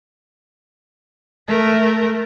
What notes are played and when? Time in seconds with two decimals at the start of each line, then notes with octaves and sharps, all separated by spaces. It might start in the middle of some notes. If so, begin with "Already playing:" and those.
1.48 A3 A#4